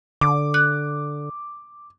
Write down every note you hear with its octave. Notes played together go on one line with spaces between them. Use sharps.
D3 D6
F#6